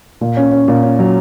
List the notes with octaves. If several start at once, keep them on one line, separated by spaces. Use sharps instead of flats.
A#2
C#4
C#4
A#2
C#4
F#3